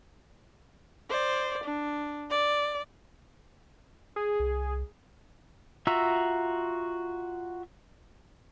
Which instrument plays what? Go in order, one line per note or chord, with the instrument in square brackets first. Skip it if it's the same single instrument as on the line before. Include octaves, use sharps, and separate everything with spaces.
[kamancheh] C5 D5
D4
D5
[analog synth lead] G#4
[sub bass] C2
[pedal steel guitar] F4 F#4 E5 A#5 E6